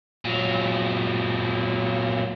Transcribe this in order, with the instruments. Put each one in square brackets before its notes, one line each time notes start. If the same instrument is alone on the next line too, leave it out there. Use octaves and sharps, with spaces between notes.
[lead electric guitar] A#2 F#3